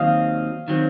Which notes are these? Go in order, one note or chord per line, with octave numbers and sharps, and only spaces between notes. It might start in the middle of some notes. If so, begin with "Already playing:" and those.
Already playing: D#2 D#3 F#3 C4 D#5 F5
D#3 F#3 C4